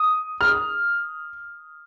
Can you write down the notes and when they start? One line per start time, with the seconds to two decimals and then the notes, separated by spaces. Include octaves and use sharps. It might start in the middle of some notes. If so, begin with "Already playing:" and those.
Already playing: D#6
0.41 F6